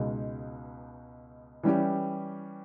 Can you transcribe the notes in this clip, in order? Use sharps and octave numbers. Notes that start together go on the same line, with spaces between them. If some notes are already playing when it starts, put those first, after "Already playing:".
Already playing: C#2 B2 G#3 D#4
E3 G3 C#4 G4